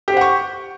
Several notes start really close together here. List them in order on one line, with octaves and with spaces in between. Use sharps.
G4 C5 F#5 C#6